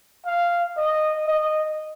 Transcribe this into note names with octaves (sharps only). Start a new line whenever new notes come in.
F5
D#5
D#5